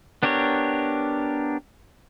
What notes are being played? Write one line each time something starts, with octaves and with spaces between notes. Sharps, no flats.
B3 D4 G4 A#4 C#5